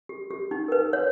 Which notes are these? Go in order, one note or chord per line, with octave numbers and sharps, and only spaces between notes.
G4
G4
D#4
A#4
B4
C#5